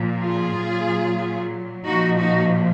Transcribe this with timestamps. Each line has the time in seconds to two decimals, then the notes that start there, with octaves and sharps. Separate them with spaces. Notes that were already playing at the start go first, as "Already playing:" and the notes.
Already playing: A#2 F3
0.21 F4 G#4
0.54 A#2 F#3
1.86 A#2 F3 D#4 F#4
2.18 D#4 F#4